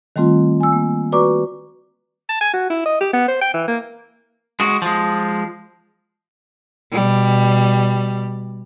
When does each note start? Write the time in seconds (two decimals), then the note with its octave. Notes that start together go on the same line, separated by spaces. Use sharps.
0.16 D#3 G3 A3 C4 F4
0.61 G#5 E6
0.72 A#3
1.12 F#4 B4 D5 A#5 C#6 D6
2.29 A5
2.41 G#5
2.54 F#4
2.70 E4
2.86 D#5
3.00 G4
3.13 B3
3.28 C5
3.42 G5
3.54 E3
3.68 A#3
4.60 G#3 F#4
4.82 F3 G#3
6.92 B2 G3